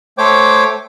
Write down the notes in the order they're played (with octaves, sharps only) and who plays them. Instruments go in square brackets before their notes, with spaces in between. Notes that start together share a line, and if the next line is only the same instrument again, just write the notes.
[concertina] A3 C5 C#5 G5 D6